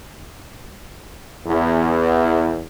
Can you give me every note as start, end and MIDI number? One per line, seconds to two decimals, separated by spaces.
1.46 2.62 40